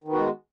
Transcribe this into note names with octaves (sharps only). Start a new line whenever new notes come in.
D#3 G#3 B3 F#4